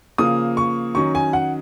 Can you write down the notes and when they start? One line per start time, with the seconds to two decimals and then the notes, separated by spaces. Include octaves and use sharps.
0.18 C#3 F3 A#3 D#6
0.57 C#6
0.95 D#3 F#3 C#4 C#6
1.15 G#5
1.33 F#5